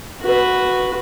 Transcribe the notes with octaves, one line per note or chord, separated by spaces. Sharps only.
F#4 B4